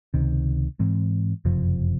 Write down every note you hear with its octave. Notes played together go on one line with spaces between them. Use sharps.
C#2 C3 D#3
G#2 E3 G#3 C4
F#1 F2 C3 F3